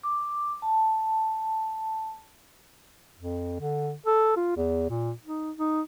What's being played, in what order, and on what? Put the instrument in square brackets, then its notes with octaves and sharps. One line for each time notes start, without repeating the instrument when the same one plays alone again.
[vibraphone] D6
A5
[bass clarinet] F2
D3
A4
F4
E2
A#2
D#4
D#4